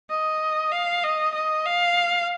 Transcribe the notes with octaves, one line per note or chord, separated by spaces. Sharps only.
D#5
F5
D#5
D#5
F5